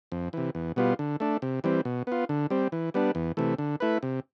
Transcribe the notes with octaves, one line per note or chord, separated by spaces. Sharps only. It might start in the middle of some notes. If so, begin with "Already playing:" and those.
F2
C3 E3
E2
B2 G3 B3 F4
D3
A3 D4
C3
E3 G3 C4
B2
B3 F4
D3
G3 C4
E3
G3 B3 D4
E2
C3 E3 A3
D3
A3 E4 B4
C3